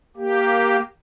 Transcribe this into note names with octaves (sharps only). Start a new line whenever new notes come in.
A#3 G4